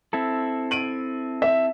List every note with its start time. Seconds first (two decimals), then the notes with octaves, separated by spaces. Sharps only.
0.13 C4 E4 A4
0.71 D7 D#7 F#7
1.42 E5